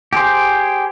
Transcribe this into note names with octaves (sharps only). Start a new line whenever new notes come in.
G4 G#4 C5